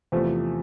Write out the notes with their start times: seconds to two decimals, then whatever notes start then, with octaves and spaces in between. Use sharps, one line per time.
0.12 E2 C3 F3 A3